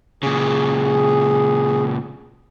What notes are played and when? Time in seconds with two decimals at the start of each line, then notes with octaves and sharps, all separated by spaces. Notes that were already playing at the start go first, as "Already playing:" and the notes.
0.23 A#2 C#3 G#4